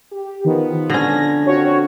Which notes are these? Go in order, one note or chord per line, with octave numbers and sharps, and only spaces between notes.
G4
D#3 F3 B3
D3 C#4 A#6
F2 F#4 C#5